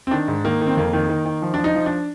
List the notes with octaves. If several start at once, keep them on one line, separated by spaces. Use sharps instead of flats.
C4
D#3 D4
G#2
D#3 A#3
D#3
C4
F2 A#3
D#3
D#3
D#3
F3
F3 D4
D#4
F3
D4